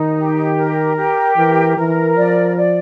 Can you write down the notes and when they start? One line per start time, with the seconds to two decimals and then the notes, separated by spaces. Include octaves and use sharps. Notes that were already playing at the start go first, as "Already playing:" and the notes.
Already playing: D#3 D#4
0.17 G4
0.57 A#4
0.96 G4
1.37 E3 A#4
1.77 E3 A#4
2.16 F3 D5
2.57 D5